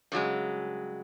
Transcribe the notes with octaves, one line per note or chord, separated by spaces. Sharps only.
G2 C#3 F#3 G#3